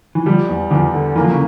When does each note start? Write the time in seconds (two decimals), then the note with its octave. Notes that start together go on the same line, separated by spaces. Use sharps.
0.15 E3
0.26 D3 F3 G3
0.49 E2
0.71 E2 D3 F3
0.94 D3
1.16 E3 A#3
1.24 F3
1.31 C#3 E3